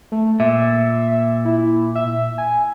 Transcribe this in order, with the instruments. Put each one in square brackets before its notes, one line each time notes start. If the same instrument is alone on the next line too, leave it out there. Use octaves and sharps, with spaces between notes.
[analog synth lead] A3
[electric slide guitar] A#2 [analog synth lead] E5
[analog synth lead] E4
E5
G#5